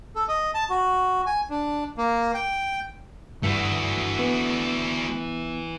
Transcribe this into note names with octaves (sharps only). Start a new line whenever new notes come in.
A4
D#5
A5
F#4
G#5
D4
A#3
G5
G2 E3 A3 E4 F#4
B3